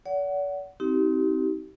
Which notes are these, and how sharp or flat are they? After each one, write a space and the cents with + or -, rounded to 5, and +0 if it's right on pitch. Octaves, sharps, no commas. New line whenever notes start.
D5 -45 F#5 +10
C4 +0 D#4 +35 G4 -30